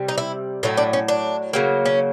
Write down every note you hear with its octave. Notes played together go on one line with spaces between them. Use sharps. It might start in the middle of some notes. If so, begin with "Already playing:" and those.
Already playing: C3 G3
D#4
E4
A2 F#3 A3 D#4
D4
C#4
D4
C#3 F#3 A#3
C#4